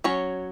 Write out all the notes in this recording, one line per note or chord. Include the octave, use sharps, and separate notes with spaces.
F#3 C#4 C#5